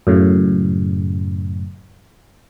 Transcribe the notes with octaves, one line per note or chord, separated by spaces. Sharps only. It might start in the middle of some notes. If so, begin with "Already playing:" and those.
F#2 A2 C#3